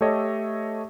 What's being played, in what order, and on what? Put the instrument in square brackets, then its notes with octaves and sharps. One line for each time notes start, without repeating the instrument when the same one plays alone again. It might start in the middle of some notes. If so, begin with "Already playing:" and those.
[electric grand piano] A3 G4 A4 C#5 D#5